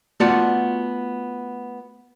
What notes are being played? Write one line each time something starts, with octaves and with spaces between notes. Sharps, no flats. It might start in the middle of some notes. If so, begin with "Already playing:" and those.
A3 B3 F4 F#4 D5 F#5